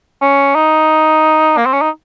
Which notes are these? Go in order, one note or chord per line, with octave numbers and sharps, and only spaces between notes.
C#4
D#4
A#3
C4
C#4
D#4